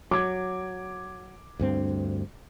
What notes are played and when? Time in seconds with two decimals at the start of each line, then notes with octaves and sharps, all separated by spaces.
0.11 F#3 D6 G#6
1.60 D2 G2 C4